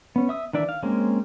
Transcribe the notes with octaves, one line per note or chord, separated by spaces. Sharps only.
B3 C#4
E5 D#6 E6
D#3 E3 D4 D5 E5
F5
G#3 A#3 C4 C#4